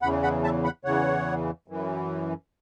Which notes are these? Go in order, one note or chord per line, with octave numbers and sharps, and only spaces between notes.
E2 C#3 E3 F#5 B5
F#5 B5
E5 A5
F#5 B5
E2 C#3 E3 C#5 F#5
F#2 E3